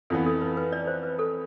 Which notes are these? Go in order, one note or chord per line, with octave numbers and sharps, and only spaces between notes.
F2 E3 B3 A4
A4
B4
B4
D5
C5
B4
A4